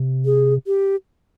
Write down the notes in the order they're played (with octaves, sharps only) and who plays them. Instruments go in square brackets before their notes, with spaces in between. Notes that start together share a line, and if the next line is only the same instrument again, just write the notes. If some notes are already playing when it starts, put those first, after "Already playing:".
Already playing: [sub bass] C3
[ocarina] G#4
G4